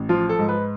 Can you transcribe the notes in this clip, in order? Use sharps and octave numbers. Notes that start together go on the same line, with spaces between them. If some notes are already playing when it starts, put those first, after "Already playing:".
Already playing: A1
F3 F4
A4
G#2
B4